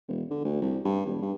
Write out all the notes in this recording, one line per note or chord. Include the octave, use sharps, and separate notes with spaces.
E1
D3
D2
C2
G2
E1
G2